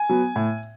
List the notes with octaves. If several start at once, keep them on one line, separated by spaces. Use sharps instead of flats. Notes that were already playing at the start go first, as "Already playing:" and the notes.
Already playing: G#5
F#3 B3
A2